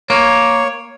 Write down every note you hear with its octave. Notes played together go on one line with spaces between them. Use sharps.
A#3 C#5